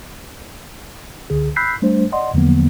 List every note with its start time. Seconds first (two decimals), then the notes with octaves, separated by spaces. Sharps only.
1.30 C#2 D3 G#4
1.56 B5 E6 F#6 G6 B6 C7
1.82 G3 A3 D4 C5
2.12 D5 D#5 F#5 C6
2.34 E2 D3 F3 F#3 A#3 B3